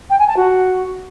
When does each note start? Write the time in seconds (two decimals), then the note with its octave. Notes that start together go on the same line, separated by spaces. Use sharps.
0.10 G5
0.19 G#5
0.28 A5
0.37 F#4